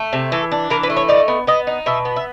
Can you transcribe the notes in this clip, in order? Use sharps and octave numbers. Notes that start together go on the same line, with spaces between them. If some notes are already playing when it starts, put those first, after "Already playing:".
Already playing: A3
C3
E3 A4
D4
E3 A#4
B4
A3
C#5
D#4 D5
B3
B3 D#5
D#4
B2 E5
B3
E5